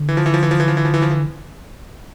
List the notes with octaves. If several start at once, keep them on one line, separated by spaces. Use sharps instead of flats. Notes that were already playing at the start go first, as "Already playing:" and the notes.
Already playing: D3
E3
F3
E3
F3
E3
F3
E3
F3
E3
F3
E3
F3
E3